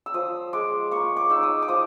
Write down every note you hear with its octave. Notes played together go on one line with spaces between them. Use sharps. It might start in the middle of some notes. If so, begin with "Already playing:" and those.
E6
F3 D#6
G#3 D6
A#3 C#6
D6
D#4 E6
D#6
D6
F3 D#6